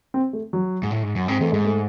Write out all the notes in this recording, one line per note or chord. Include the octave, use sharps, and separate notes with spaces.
C4
A3
F#3
G#2
A2
G#2
F#2
G#2 C4
E2 A3
G#2 G#3
A3